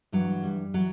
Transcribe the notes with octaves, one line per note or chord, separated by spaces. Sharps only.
G2 E3 F#3
G3
E3 F#3